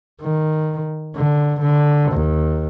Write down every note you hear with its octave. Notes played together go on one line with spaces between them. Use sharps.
D#3
D3
D3
D#2